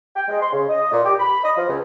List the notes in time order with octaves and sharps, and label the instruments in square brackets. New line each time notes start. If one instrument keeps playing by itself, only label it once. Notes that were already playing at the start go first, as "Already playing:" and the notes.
[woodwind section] G5
G#3
C6
C#3
D#5
A#2
G4
B5
D#5
F3
C#2